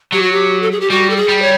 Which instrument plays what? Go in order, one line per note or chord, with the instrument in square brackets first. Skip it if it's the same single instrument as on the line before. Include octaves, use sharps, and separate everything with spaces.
[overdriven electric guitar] F#3 [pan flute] G4
[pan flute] F#4
G4
A4
G#4
G4
[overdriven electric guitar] G3 [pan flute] F#4
[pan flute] A4
G#4
[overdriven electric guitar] G3
[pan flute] C#5